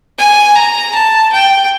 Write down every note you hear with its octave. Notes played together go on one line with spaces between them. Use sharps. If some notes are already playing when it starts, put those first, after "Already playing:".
G#5
A#5
A5
G5